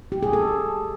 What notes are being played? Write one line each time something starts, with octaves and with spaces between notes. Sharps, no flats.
G4
G#4
A4